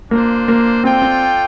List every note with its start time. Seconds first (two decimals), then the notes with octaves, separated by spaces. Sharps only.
0.11 A#3 D4 F4 C5
0.48 A#3
0.84 C4 F4 A4 D5 G5
1.02 C4